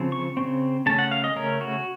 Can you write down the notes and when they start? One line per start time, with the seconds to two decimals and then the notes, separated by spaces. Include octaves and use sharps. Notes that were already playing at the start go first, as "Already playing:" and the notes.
Already playing: C#3 F3 C4
0.12 C#6
0.37 C#3 F3 C4
0.86 C#3 A3 C#4 A5
0.99 F#5
1.11 F5
1.24 D#5
1.36 C#3 A3 C#4 A#4
1.61 F#4